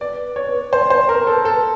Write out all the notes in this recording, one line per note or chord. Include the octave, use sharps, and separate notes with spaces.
B4 D5
C#5
C5
C5
A#4
A4
A4